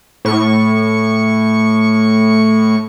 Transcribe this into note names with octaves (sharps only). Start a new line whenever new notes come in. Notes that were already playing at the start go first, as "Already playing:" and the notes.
A2 C#6